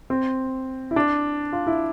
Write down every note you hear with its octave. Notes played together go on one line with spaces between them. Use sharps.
C4
E4
D4
F4
E4